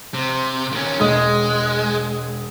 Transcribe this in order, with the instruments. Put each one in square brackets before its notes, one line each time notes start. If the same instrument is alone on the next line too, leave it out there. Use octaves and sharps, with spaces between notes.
[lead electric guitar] C3
D#3 C#4
[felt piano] E1 D#5 D#6 [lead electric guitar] G#3